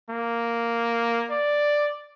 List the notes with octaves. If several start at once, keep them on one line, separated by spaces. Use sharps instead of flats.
A#3
D5